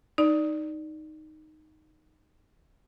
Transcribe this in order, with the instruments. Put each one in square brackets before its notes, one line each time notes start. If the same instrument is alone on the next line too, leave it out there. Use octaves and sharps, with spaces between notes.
[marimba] D#4 D5